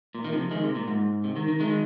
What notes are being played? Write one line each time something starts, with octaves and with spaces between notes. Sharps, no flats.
A#2
D#3
C3 F3
D#3 G#3
C3
A#2
G#2
C3
D#3
D#3
D#3 G#3